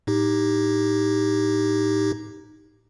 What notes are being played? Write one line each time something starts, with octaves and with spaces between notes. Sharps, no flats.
A2 D#4 G4